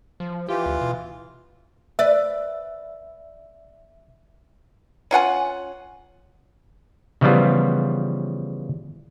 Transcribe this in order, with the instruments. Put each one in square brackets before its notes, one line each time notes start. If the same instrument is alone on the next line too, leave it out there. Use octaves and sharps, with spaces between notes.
[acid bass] F3
[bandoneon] E3 F4 [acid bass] G4
[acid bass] D2
B2
[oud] B4 D5 [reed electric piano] E5
[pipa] C#4 F4 F#5 G#5
[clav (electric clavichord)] C#3 E3 F3 G3 B3 F4